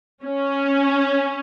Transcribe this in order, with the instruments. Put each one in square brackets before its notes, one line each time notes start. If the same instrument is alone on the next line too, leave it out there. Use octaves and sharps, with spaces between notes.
[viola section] C#4